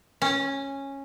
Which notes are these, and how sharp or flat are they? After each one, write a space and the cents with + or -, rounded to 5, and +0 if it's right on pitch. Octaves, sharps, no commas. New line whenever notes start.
C#4 -10